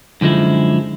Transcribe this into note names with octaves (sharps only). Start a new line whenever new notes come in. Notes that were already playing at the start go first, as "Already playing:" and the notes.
F#2 D3 F3 G#3 E4